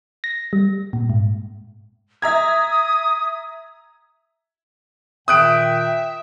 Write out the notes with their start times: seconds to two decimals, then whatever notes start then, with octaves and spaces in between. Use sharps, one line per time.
0.24 A#6
0.53 G3
0.93 A#2
1.10 G#2
2.22 E5 A#5 D#6 G#6
5.28 A#2 D#3 E5 G5 D#6 F#6 D7